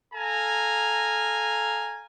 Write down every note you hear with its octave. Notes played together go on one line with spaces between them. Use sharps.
A4 F5 G#5 A#5